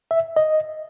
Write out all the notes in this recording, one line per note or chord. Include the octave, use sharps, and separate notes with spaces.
E5
D#5